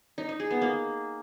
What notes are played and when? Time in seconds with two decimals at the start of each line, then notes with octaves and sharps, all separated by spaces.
0.18 D#4
0.29 D#4
0.40 G#4
0.51 B3
0.61 A#3